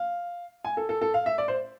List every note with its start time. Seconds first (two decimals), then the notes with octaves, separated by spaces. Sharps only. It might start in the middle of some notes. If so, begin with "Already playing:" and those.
Already playing: F5
0.65 G#5
0.77 A4
0.89 A4
1.01 A4
1.14 F5
1.26 E5
1.38 D5
1.48 C5